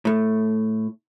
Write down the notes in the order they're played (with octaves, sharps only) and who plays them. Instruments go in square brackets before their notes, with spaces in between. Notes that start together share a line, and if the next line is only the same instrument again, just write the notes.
[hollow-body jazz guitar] A2 A3